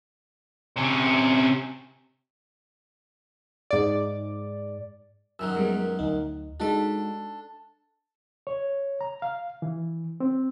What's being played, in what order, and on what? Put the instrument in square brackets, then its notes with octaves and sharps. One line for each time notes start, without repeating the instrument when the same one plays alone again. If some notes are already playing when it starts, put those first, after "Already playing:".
[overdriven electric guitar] C3 C#4
[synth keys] G#2 D5
[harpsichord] F#2 D#3 F#3 [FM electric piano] E6
[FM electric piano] G3 G#3 B3
D2 D#4
[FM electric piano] G#3 D#4 F#4 [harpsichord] D4 A4
[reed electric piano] C#5
A#5
F5
E3
C4